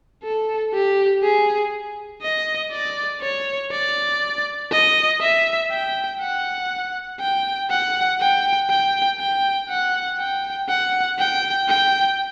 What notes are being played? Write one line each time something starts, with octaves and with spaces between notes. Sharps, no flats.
A4
G4
G#4
D#5
D5
C#5
D5
D#5
E5
G5
F#5
G5
F#5
G5
G5
G5
F#5
G5
F#5
G5
G5